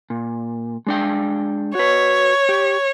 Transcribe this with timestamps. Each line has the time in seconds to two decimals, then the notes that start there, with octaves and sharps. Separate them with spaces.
0.10 A#2
0.86 G#3 D4 G5
1.75 F#4 B4 C#5
2.49 G4